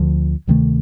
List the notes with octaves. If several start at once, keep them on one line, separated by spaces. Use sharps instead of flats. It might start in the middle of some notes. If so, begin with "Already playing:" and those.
Already playing: D2 D3 F3
D2 C3 D#3 A3